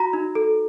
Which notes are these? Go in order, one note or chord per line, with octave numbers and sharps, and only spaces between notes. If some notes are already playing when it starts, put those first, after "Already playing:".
Already playing: F#4 A#5
D#4
A4